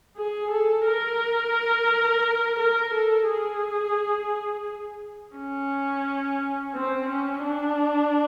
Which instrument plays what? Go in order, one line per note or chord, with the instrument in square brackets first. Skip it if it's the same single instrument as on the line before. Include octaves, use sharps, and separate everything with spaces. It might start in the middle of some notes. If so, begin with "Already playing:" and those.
[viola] G#4
A4
A#4
A#4
A4
G#4
C#4
C4
C#4
D4